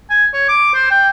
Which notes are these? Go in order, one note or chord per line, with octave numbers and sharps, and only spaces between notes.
G#5
C#5
D6
C5
G5